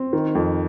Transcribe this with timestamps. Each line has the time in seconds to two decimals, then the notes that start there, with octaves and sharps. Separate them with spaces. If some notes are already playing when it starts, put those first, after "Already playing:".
Already playing: C4
0.13 D#3
0.35 F2